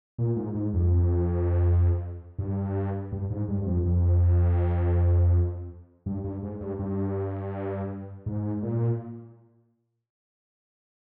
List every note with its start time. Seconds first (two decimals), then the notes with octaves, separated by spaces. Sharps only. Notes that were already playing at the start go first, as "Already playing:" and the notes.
0.18 A#2
0.36 G#2
0.55 G#2
0.74 F2
2.38 G2
3.12 G2
3.30 G#2
3.48 G2
3.62 G2
3.66 F2
3.85 F2
6.06 G2
6.24 G2
6.43 G#2
6.61 G2
6.79 G2
8.26 G#2
8.63 A#2